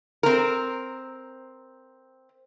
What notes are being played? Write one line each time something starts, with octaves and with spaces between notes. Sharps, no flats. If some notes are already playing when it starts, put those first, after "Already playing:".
C4 A#4